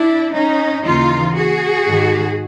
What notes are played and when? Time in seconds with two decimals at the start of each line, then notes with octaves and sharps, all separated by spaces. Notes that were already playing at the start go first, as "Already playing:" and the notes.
Already playing: D4 E4
0.33 C#4 D#4
0.84 D#2 C#3 E3 D#4 F4
1.35 F#4 G#4
1.85 G#2 D#3